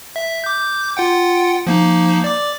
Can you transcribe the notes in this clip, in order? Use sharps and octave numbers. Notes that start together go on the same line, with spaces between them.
E5
D6 G6
F4 F#5 G5
F3 A#3 D#4
D5 D6